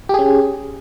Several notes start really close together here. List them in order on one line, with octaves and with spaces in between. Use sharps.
G4 G#4 C#4